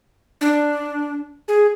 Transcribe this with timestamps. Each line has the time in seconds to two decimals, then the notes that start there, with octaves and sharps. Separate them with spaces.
0.41 D4
1.48 G#4